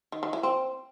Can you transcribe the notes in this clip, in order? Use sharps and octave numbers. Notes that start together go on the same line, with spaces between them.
D#3
D#3
E3
C4